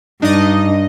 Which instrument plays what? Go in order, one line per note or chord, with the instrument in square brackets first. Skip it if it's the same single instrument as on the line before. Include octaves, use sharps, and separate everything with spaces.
[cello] G2 [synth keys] D4 D#5 [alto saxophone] D#4